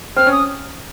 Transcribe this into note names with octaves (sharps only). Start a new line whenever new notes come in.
C4 F6
C#4 D#6